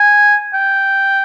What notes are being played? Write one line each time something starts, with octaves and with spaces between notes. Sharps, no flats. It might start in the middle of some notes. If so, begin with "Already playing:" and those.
Already playing: G#5
G5